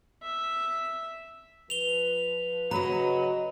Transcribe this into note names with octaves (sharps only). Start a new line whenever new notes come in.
E5
F3 B4 F7 G7
C#3 F#3 B4 D#5 A#5